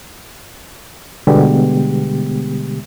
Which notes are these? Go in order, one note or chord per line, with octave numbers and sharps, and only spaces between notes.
B2 D3 G3 G#3 B3 G4